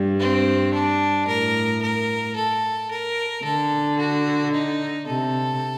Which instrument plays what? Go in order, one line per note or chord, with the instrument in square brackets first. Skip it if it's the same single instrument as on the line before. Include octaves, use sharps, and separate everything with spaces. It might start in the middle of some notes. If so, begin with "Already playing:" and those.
Already playing: [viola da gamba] G2
[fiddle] C4
D4
[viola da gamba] A2 [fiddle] A#4
[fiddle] A#4
A4
A#4
[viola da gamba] D3 [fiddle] A4
[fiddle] F#4
D#4
[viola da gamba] C3 [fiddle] A4